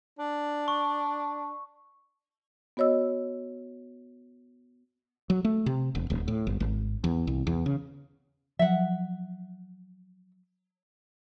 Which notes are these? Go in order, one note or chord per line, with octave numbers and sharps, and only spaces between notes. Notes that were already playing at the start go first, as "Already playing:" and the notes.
D4
C#6
B3 F#4 C#5 D#5 E6
F#3
A3
C3
E1
D1
A2
G1
G#1
E2
C2
E2
C#3
F3 F#3 E5 F#5